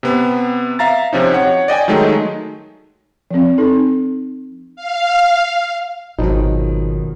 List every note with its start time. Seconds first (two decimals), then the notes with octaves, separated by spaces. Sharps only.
0.03 C3 B3
0.79 E5 F5 A#5 A6
1.13 C3 F3 C#4 D#4
1.34 C#5 F#5
1.68 D5 D#5 G5 G#5
1.88 D#3 F#3 G#3 A3 D#4
3.31 F3 C4
3.58 C4 D#4 A4
4.76 F5
6.19 G#1 B2 D#3 F3 F#3 D#4